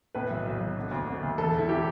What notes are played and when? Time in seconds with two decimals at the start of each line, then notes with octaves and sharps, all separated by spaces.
0.15 A2 B4
0.30 B1
0.45 B1
0.60 B1
0.77 D3
0.91 D2
1.06 D3
1.23 D2
1.38 E2 A4
1.53 E1
1.58 E4
1.69 E3 G4